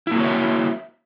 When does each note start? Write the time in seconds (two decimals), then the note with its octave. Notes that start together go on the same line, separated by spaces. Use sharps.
0.07 E4
0.11 A#3
0.16 F#4
0.20 C#5
0.24 E5